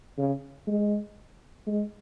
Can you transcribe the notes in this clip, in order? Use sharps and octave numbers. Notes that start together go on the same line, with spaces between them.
C#3
G#3
G#3